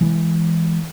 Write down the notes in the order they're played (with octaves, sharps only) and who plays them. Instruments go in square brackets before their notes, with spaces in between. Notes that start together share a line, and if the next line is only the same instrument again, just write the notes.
[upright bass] E3 G#3